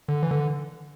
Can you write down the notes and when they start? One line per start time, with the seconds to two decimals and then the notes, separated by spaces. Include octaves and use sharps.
0.08 D3
0.23 E3
0.31 D3